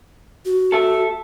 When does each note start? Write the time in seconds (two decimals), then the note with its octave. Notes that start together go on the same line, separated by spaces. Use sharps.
0.45 F#4
0.72 A4 E5